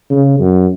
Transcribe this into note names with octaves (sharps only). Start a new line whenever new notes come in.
C#3
F#2